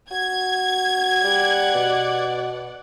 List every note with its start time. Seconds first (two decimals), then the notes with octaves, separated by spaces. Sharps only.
0.11 F#4 G#6
1.24 G3 D5 F#5
1.75 B2